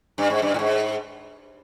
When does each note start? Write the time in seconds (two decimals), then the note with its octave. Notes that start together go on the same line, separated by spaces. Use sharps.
0.18 G2
0.30 G#2
0.42 G2
0.54 A2
0.59 G#2